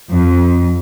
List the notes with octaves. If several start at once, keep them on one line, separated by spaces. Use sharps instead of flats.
F2